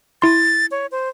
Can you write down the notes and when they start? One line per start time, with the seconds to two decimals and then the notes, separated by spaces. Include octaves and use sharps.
0.22 E4 C6 A6
0.71 C#5
0.92 C5